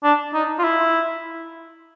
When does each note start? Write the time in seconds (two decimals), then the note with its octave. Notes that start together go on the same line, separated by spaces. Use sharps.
0.04 D4
0.34 D#4
0.59 F4
0.64 E4